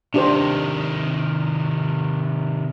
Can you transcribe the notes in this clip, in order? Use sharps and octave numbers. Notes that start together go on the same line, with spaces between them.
C3 D#3 D4 G4 C5